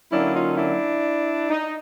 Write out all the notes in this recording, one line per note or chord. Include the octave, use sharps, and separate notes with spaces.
D3 F#3 A#3 C#4 D4 E4
D#4 F4
D4 E4
D#4